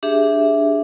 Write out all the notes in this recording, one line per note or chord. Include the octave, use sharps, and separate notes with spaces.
D4 G4 G#4 E5